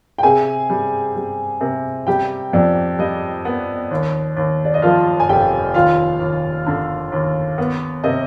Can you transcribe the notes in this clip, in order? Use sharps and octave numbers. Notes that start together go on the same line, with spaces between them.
G5
C3 G#4 G#5
G3
G3
C3
G3 G4 G5
F2 D5
G3 D#5
B3
D#2
D#2
D5
D#5
F3 F4 F5
G#5
F1 G4 G5
D#2 F4 F5
D#2
D3
D#2
B3
C3 D#5